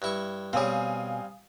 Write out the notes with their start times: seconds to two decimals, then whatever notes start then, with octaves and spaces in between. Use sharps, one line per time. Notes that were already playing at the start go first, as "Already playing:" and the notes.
0.02 G2 E4 C#6
0.53 B2 G3 C4 C#5 F5 G#5 D#6